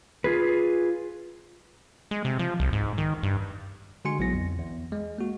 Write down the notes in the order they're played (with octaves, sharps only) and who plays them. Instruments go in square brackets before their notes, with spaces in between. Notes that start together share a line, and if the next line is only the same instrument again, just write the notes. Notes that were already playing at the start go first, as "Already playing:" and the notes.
[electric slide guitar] F4 G#4 B4
[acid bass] G#3
C3
F3
C2
G#2
D#3
G2
[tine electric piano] D3 G#3 F#4 G#5 C6 C#7
A#1 F#3 B3 E4 A#6
F2
E2
G#3
A#3 F#4